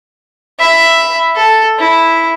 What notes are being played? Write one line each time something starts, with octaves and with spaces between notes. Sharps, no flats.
E5 B5
A4
E4